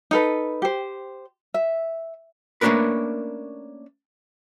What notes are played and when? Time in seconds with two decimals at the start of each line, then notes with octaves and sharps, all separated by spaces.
0.11 D#4 A4 B4
0.62 G4 C5
1.54 E5
2.61 A3 A#3 C#4 D4 A#4 B4